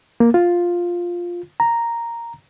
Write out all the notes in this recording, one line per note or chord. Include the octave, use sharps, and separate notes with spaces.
A#3
F4
A#5